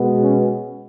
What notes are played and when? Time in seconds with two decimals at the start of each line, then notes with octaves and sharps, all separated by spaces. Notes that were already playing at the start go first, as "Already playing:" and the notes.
Already playing: B2 G#3 B3
0.22 C#4